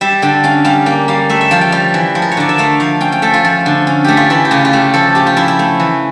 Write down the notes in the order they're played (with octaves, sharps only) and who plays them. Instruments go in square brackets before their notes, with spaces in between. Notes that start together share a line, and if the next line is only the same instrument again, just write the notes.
[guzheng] G3 E5
D3 G5
C#4 F5
G3 F5
A#3 G5
G3 F5
A3 E5
E5
F3 F5
G5
G3
E3
F3
A#4
C#5
D3 D5
E5
A3 F5
F3 F5
C#4 G5
G5
A3 A4
F4
F3
D3
C#4
A3 G4
F4
E3 E4
G4
C#3 F4
F4
A3 G4
F3 A4
C#4 G4
F4
F3 E4
E4
A3
E3